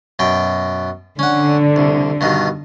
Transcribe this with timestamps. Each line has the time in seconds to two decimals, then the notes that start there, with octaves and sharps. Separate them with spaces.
0.19 F#2 B2 G5
1.19 D3 C#4 F#5
1.76 C2
2.21 G2 B2 D#3